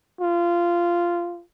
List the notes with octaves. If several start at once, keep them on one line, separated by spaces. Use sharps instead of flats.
F4